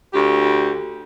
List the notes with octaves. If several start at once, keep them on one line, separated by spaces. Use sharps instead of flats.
D2 G4